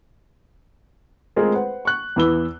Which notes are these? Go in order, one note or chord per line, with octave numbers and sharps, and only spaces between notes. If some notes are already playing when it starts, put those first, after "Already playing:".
G#3 A3 C4 F4 G#4 A#4
B4 C5 F#5
C#6 F#6
E2 E3 B4 E6 G7